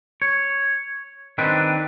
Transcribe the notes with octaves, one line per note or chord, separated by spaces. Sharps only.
C#5
D#3 C4 D4 B4